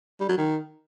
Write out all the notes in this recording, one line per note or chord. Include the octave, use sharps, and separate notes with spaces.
G3
F#3
D#3